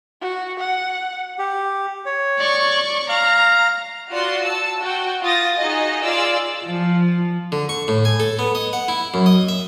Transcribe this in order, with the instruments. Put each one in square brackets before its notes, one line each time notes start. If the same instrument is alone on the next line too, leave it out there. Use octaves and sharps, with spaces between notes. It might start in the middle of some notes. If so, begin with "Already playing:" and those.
[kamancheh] F#4
F#5
[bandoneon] G4
C#5
[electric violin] D5 C#6
[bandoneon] F5 F6 [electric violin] A#5
[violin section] F4 F#4 D5 C6
A5 E6
F#4 G5
F4 D#6 A6 A#6
D#4 F#4 G#4 D#5
F4 G#4 D5 F5 D6 E6
[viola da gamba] F3
[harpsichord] D3
C#6
A2
G#5
A4
B3
D#5
F#5
E4
F#2
D#5
E5